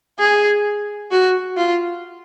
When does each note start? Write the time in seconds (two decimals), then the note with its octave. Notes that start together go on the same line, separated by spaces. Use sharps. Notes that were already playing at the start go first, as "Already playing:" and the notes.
0.19 G#4
1.11 F#4
1.57 F4